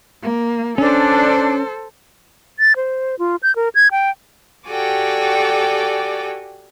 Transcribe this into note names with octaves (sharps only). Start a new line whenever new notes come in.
A#3
C#4 D4 A4 C5
A6
C5
F4
G6
A#4
G#6
G5
F#4 G4 A4 D5 G5 G#5